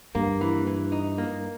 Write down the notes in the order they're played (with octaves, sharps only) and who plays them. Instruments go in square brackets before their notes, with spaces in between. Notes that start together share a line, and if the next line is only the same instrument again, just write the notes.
[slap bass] G2 [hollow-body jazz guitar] A#3
[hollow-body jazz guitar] E3
E3
D#4
A#3